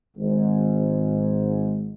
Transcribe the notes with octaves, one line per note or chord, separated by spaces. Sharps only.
G#1 G#2